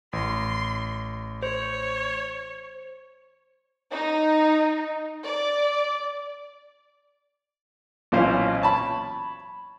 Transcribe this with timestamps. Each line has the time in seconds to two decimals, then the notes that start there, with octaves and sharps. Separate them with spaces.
0.13 A1 C6
1.43 C5 C#5
3.94 D#4
5.24 D5
8.12 B1 A#2 E3 C#4 C5 F5
8.62 C#5 A5 B5